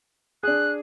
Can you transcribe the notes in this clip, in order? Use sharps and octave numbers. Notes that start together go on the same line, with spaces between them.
D4 G#4 F#6